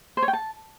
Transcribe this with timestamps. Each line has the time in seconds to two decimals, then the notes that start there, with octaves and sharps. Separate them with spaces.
0.17 C5
0.22 C#5
0.28 G5
0.33 A5